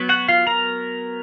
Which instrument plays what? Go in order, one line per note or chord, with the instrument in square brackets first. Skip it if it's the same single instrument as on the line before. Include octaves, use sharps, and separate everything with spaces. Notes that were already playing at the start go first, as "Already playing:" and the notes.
Already playing: [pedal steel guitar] F#3 B3
F#4 F#5
F4 F5
A#4 A#5